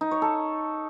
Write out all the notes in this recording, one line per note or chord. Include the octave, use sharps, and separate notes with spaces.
D#4
C#5
A4